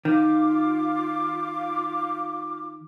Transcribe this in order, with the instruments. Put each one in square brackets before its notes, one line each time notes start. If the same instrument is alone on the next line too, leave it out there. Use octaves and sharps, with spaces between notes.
[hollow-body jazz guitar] D#3 [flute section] F4 D6